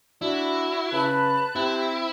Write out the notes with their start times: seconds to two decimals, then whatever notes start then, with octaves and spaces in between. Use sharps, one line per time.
0.22 D4 E4 F#4
0.92 C#3 B4 A5 B5 F#6
1.56 C4 E4 G4